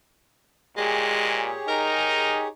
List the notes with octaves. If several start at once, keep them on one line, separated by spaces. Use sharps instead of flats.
A#2 G#3 G4 G#4 C#5
D#4 A#4